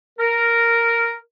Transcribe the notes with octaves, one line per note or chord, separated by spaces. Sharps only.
A#4